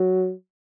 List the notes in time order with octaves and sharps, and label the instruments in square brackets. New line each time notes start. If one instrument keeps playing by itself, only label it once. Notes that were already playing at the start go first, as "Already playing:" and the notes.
Already playing: [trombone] F#3